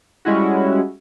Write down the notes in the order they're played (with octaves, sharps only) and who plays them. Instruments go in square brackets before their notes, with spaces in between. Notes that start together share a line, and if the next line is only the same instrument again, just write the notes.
[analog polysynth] G3 G#3 C#4 E4 F#4